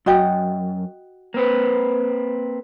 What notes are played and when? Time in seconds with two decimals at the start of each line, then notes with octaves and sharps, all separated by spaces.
0.06 F#2 F#4 D#5 G5
1.34 A#3 C4 B4